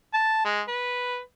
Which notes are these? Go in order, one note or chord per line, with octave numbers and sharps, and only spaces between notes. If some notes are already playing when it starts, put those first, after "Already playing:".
A5
G#3
B4